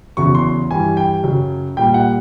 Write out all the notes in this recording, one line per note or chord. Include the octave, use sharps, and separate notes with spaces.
E2 C#3 F#3 C#6
C6
G2 E3 G3 G#5
G5
F#2 C#3 F#3
A#2 G3 G5
F#5